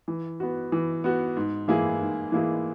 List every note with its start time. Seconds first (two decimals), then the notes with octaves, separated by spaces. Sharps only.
0.08 E3
0.40 B3 F#4
0.72 E3
1.04 B3 F#4
1.37 G#2
1.68 E3 A#3 E4 G#4
2.01 G#2
2.32 E3 A#3 E4 G#4